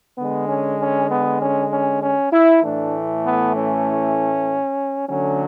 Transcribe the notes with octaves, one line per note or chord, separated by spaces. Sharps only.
D3 G#3 B3
C#4
C#4
B3
C#4
C#4
C#4
E4
A2 E3 A3 D4
B3
C#4
D3 F#3 A3 C#4